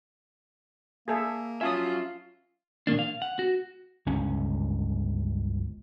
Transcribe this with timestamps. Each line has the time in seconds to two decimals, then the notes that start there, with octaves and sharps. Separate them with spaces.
1.08 A#3 G#4 A4 E5
1.61 F#3 C#4 F4 E5 G#5 A5 D#6
2.87 A#2 D#3 A#3 D4
2.99 F5
3.22 F#5
3.39 F#4
4.06 G1 C#2 C#4